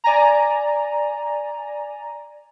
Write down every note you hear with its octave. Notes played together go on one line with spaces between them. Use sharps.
D5 G#5 A#5